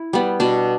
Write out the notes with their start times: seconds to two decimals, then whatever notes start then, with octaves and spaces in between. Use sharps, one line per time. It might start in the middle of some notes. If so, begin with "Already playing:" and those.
Already playing: E4
0.13 G3 B3
0.40 B2 D4